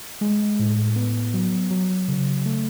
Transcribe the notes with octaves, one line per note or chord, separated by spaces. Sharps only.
G#3
A2
B3
F#3
F#3
C#3
A3